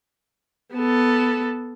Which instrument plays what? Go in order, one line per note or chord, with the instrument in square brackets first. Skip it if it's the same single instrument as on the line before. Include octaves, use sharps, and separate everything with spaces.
[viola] B3 A4